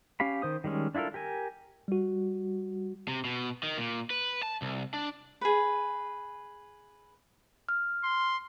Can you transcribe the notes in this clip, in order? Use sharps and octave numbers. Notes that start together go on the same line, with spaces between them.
C#4 G4 F5 B5
D#3 C5 D#6
D#3 G3 G#3 C#4
D4 E4 F4 A4 A#4
G4 A#4 G#5
G3 F#4
C3
B2
D#3
A#2
B4
A5
C2
D4
G#4 B4
F6
C6